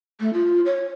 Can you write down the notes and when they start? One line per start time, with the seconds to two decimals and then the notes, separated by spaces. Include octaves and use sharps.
0.20 A3
0.33 F4
0.66 C#5